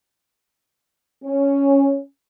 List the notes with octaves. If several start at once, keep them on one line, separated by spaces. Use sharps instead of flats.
C#4